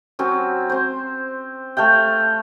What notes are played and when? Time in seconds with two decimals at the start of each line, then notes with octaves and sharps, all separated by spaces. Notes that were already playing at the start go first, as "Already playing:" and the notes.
0.19 F#3 C4 C#4
0.70 C4 C5
1.77 A3 A4 F5 G5